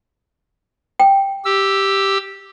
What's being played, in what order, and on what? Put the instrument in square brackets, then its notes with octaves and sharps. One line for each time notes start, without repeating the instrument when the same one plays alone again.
[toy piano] G5
[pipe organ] G4 E6